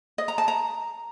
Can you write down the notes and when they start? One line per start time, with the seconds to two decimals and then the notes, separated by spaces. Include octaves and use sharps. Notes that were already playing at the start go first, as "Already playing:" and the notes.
0.18 D#5
0.28 A#5
0.38 A5
0.48 A#5